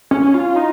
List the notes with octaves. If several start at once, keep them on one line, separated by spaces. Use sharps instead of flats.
C#4
F4
D#4